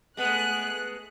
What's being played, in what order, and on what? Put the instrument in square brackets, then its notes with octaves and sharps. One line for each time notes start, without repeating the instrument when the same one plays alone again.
[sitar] G#3 B3 [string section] A3 F#6